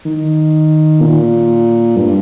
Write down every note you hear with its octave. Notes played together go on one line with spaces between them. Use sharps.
D#3
A#2
G2